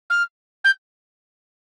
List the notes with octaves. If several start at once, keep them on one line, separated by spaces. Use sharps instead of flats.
F6
G6